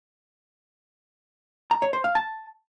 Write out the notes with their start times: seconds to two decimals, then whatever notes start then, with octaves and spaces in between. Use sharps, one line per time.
1.71 A#5
1.82 C#5
1.93 C5
2.04 F5
2.15 A5